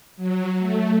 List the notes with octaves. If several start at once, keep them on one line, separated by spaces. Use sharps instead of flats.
F#3
A3